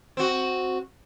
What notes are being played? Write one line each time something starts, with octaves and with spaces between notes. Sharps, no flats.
C4 F#4